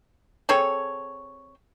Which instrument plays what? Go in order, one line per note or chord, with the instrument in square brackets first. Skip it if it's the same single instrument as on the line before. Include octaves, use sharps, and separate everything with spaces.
[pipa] C4 G#4 A4 C#5